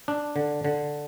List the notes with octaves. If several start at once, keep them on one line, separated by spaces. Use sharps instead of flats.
D4
D3
D3